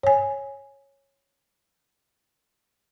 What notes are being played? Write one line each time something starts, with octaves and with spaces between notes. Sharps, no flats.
C#5 G#5